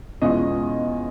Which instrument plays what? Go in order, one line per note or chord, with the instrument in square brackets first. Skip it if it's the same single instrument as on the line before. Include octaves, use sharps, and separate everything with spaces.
[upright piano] E2 B2 G#3 C#4 F4 D#5